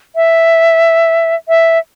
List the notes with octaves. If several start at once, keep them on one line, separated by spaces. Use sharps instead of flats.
E5
E5